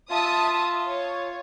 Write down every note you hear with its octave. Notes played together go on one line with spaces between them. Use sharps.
F4 E5 A5 D#6
C#5